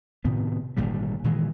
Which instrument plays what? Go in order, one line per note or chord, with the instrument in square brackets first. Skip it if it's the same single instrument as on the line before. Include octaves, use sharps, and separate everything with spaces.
[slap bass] A2 C3 D#3 B3
G#1 A#2 D3 G3
A#2 D#3 E3 G#3